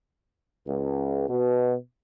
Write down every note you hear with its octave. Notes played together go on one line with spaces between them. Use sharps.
C#2
B2